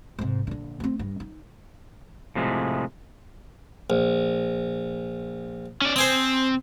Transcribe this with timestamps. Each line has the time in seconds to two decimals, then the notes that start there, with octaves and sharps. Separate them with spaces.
0.19 G#2 C3
0.47 A#1 D3
0.80 A3 C4
0.99 G2
1.20 D#4
2.35 A2 C3 F3 G#3
3.90 A#1
5.81 C#4 D5
5.96 C4 C5 G#5 D#6